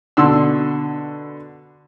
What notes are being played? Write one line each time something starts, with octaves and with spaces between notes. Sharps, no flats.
B2 D3 C6 E6